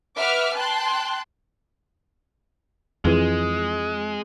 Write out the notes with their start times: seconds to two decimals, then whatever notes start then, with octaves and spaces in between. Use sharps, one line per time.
0.17 B4 E5 F#5 D6 F6
0.55 G5 A5 C6 F#6
3.05 F2 E3 G#3 C4 F4 G#4